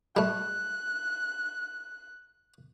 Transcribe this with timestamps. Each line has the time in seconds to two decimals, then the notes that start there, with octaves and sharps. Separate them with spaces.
0.17 G3 A3 F#6